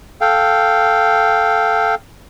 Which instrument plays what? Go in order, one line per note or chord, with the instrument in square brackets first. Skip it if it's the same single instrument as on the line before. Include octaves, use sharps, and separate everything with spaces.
[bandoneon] A4 F5 G5